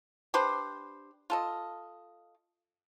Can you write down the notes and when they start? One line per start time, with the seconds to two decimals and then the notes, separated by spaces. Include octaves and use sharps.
0.34 D4 G4 B4 C5
1.30 F4 A4 D#5